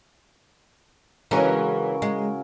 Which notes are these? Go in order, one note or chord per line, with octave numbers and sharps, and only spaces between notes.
C#3 E3 F#3 G#3 C#4 A#4
G#3